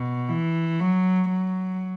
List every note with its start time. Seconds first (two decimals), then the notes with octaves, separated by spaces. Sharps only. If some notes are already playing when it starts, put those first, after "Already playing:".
Already playing: B2
0.29 E3
0.79 F#3
1.29 F#3